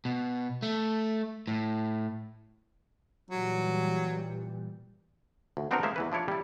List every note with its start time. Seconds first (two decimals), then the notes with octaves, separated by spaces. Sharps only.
0.05 B2
0.62 A3
1.47 A2
3.30 A#2 E3 F#3 G3
5.57 D2
5.71 B3 C4 D4 D#4 F#4 A#4
5.83 G#3 A#3 C5 E5
5.96 E2 E3 B4
6.12 F3 D4 E4 C#5 D5
6.28 G3 E4